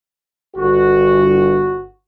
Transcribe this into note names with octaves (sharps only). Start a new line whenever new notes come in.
G1 F#4